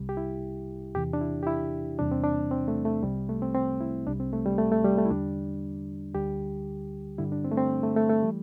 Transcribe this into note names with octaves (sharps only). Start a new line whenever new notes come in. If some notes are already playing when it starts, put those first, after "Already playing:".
Already playing: C2 C3 G3
G4
E4
E2 C3 E3 G4
D4
E4
G4
E4
E2 C3 E3 G3 D4
C4
D4
C4
A3
A3
C2 C3 G3
A3
C4
C4
E4
C2 C3 G3 D4
C4
A3
G3
A3
A3
G3
A3
E4
E2 D3 G3 D4
D2 D3 G3 G4
G2 D3 G3 E4
D4
C4
A3
C4
A3
A3
A3
E3 G3